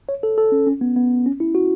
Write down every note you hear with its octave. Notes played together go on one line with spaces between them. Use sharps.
C#5
A4
A4
C#4
C#4
B3
B3
C#4
E4
F#4